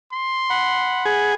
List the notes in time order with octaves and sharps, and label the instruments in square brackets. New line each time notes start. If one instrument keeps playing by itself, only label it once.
[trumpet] C6
[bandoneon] F#5 B5
[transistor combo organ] G#4